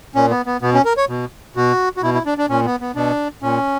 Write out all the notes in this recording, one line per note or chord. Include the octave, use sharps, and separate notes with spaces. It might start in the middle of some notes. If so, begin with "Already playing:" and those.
A#2 C#4
B3
B3
B2 B3
C#4
A#4
C#5
B2
B2 F#4
F#4
B2 E4
E4
D4
D4
A#2 C#4
B3
B3
B2 D4
A#2 C#4